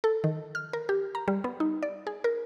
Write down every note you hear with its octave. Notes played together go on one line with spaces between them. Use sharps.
A4
D#3
F6
A#4
G4
A#5
G3
B3
D#4
D5
G#4
A#4